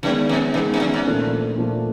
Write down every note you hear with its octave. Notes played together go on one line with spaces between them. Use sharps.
F#2 D#3 G#3 B3
F2
E2 D#3 G#3 B3
F2
F#2
G#2
A#2 F3 A3 D4
A#2 F3 A3 D4